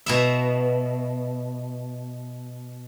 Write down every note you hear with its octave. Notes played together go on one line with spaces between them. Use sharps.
B2 E4 E5